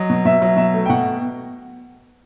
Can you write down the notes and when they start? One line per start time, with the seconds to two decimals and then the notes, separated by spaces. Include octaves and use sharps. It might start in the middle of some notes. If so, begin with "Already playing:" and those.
Already playing: F#3 D#5
0.10 B2
0.25 B2 E5
0.42 F#3
0.57 B2 E5
0.74 A3
0.86 G5
0.90 B2 F#5